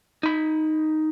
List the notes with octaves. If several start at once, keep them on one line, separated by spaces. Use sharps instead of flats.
D#4 B5